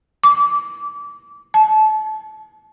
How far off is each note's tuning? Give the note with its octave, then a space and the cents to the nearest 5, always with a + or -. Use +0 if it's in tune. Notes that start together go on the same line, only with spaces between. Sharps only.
D6 -20
A5 -30